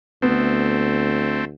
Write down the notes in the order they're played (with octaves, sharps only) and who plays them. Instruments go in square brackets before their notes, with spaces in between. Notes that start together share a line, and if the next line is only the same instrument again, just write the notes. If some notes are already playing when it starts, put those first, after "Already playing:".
[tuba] D2 [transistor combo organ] A3 C4 [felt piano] B3